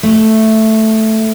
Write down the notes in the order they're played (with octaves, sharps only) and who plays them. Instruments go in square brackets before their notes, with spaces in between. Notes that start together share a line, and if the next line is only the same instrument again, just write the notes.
[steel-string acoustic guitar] A3